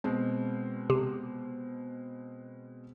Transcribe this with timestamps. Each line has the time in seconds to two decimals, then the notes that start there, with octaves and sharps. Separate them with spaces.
0.04 B2 G#3 C4
0.90 C3